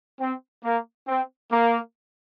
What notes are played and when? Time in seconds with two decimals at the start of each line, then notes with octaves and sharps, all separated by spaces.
0.20 C4
0.64 A#3
1.08 C4
1.52 A#3